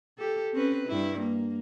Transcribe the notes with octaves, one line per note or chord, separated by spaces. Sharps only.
G4 A4
C4 C#4 B4
G2 E4
A#3